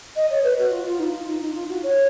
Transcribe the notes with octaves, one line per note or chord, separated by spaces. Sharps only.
D#5
C#5
B4
F#4
F4
F4
D#4
F4
D#4
D#4
F4
F#4
C#5